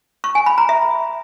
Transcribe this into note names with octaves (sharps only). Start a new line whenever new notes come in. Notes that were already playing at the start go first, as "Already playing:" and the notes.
C#6
G#5
B5
A#5
E5